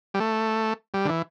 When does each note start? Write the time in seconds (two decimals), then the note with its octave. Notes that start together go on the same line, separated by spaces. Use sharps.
0.14 G3
0.20 A3
0.94 G3
1.05 D3
1.09 E3